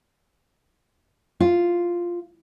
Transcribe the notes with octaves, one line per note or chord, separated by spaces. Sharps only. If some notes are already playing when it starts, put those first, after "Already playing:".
F4